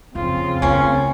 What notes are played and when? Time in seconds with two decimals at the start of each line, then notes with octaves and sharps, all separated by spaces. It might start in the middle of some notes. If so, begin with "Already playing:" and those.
0.15 F2 C#3 C4 F4
0.62 D2 A#3 C#4